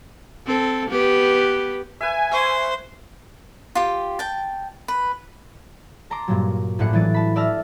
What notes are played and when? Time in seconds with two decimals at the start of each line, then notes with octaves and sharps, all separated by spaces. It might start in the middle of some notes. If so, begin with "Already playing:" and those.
0.46 C4 A4
0.89 B3 G4 B4
2.01 B4 E5 G#5
2.32 C5 E5 C#6
3.75 F4 G4
4.19 G5 A5
4.88 B4
6.10 A5 A#5 C6 D6
6.28 G2 A#2 F#3
6.79 A#1 A2 D4 F#5 C#7
6.93 E3 F#3 A6 D7
7.14 A5 B5
7.36 D5 E5 A5 E6 F6 A#6